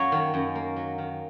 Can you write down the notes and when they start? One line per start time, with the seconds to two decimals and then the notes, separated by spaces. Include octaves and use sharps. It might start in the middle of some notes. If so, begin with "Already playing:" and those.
Already playing: F#2 F#3 A#3 C#5
0.12 D#3
0.34 F#2
0.55 A#3
0.76 F#3
0.98 D#3